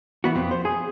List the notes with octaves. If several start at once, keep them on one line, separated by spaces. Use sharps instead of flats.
E3 B3 F#4
F2 B3 C4
C5
G#4